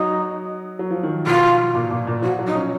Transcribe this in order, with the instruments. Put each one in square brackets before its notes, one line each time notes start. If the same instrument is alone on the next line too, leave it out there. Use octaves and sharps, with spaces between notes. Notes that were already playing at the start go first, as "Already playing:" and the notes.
Already playing: [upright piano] F#3 F#4 [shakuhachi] D#4
[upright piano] F#3
F3
D#3
[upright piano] B2 [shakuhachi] F4
[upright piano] A#2
A#2
A#2
[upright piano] F3 [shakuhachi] F#4
[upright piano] F#3
[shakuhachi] D#4
[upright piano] C#4